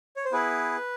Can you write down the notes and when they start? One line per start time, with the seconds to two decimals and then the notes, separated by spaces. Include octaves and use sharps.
0.16 C#5
0.25 C5
0.32 B3 E4 G#4 B4